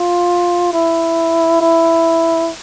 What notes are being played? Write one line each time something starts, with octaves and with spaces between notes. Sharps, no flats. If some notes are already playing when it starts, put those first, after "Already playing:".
Already playing: F4
E4
E4